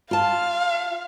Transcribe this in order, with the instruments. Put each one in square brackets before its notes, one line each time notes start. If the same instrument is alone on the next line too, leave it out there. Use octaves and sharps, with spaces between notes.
[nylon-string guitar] F4 A5 [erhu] F5